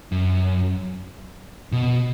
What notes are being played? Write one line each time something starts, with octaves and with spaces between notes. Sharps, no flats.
F#2
B2